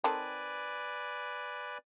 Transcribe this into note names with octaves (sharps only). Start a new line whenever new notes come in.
D#3 C4 A4 B4 D5 G#5